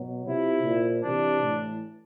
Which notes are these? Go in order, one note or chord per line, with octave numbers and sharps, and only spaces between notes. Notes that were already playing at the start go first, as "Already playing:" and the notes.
Already playing: B2 F#3
C3 F3 E4
A#2 F3
C3 E3 D4
A2 E3